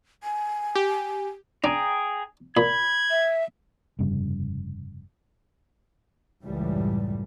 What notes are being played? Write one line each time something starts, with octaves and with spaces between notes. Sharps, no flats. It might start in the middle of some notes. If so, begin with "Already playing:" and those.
G#5
G4
D4 G#4 G5 A#5
A#2 B5 G#6
E5
F1 G2 C#3 G3
C#2 F#2 A2 E3 G3